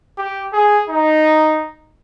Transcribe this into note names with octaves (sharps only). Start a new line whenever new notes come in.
G4
G#4
D#4